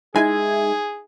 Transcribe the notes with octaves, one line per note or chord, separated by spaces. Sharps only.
G#3 D#4 E4 G#4 E5 G#5 G#6